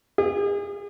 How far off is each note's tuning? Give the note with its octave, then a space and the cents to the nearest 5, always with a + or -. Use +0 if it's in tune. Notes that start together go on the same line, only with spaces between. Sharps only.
G#4 -40